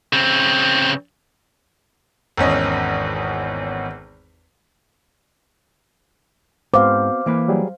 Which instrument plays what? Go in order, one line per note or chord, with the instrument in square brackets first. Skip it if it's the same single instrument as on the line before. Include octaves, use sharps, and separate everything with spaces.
[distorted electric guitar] C#3 C4
[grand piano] G#1 E2 C#4 D#5
[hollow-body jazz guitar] G#2 [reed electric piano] B3 C4 F#4 [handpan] C5 F5 [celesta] D6
[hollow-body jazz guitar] E3 A#3 B4
[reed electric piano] F#3 G3 G#4